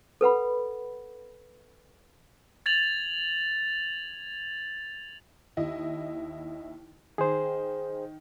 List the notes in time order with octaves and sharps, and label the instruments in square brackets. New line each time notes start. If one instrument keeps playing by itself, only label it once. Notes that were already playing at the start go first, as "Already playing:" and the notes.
[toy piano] A4 B4 F#5 B5
[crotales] G#6 A6 F7 F#7
[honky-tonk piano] D#2 E4 D#5
[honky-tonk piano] D#3 [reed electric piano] G#4 C5